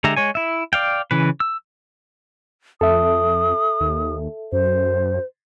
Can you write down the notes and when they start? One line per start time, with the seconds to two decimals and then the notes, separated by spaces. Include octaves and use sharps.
0.04 D3 G#3 G4 E5 A#5
0.17 G#3 C#5 G#5
0.35 E4 E5
0.73 D5 F5 G5
1.11 C#3 E3 B4
1.40 E6
2.81 F2 A4 E5 D#6
3.81 D#2
4.52 F#2 C5